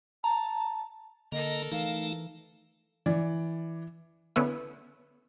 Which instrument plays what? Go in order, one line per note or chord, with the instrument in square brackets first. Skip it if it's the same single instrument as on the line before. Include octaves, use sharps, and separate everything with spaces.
[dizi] A5 [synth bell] A#5
[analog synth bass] D3 [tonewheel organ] A#3 A#5 [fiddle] A4 A#4 [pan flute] D#5
[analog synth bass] E3 [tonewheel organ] A3 D#4 [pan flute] F5
[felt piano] E3 D5
[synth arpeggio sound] D3 B3 C#4 E4